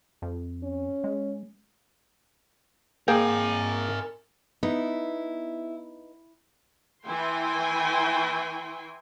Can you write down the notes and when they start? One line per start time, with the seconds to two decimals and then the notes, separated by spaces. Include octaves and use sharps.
0.22 F2
0.63 C#4
1.04 G#3
3.08 A#3 G#4 A#4 G5 G#5
4.63 B3 D#4 E4
7.04 E3 E4 G5 G#5 C6